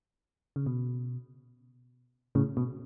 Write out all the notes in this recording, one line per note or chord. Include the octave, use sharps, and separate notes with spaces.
C#3
B2
A2 C#3
B2